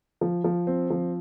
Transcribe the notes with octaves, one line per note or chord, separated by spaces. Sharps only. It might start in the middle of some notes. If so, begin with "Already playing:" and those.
F3
F3
C4
F3